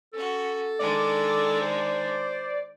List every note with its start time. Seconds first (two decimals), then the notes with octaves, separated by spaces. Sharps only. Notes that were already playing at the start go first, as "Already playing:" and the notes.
0.13 C#4 F#4 A4
0.79 D#3 G#3 D4 D5
1.61 C5